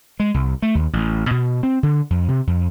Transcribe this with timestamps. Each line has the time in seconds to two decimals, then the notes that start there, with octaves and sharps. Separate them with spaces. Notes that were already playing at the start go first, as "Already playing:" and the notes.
0.20 G#3
0.34 C2
0.62 A3
0.75 D#2
0.93 A1
1.31 B2
1.63 C4
1.83 D3
2.10 F2
2.28 C3
2.47 F2